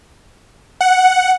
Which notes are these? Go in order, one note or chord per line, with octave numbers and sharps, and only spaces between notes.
F#5